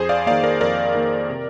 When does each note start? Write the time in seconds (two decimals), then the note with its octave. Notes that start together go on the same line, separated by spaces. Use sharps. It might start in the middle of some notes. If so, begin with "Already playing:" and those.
Already playing: F2 G#4 C5
0.09 D5 F5
0.26 D#3 A#3 D5 F5
0.43 A#4 D5
0.61 F2 A#4 D5
0.95 D#3 A#3
1.30 C3